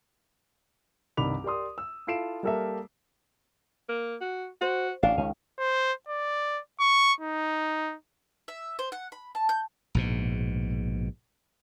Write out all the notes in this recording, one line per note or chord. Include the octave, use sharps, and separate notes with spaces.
C2 G2 D#3 B5 D6 F7
G4 A#4 D5 C6 D#6
E6
E4 F4 A4 C7 D7 E7
G3 A#3 G4 A4 A#4 E5
A#3
F#4
F#4 C5
A1 D4 F5
C#2 D#3 C#4
C5
D5
C#6
D#4
E5
C5
F#5
B5
A5
G6
A#1 G#2 B2